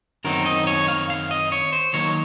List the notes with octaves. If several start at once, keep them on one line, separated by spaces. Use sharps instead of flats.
F#2 D#3 F#3 C4 D#4 A#4
D#5
C#5
F5
F5
D#5
C#5
C5
D#2 D#3 F#3 A#3 D#4 C#5